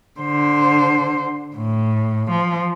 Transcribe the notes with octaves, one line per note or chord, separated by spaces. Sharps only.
D3 C5
A2
F3